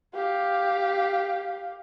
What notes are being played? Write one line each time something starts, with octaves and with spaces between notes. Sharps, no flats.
G4 F5